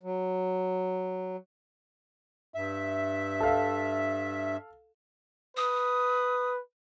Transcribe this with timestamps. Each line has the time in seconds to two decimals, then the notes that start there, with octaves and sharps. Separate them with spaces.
0.03 F#3
2.54 G2 E5
3.40 A4 F5
5.57 B4 D#6